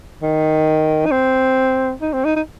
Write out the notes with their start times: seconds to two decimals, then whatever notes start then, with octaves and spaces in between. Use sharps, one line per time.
0.22 D#3
1.06 D#4
1.12 C4
2.02 D#4
2.13 C4
2.25 D#4
2.36 D#4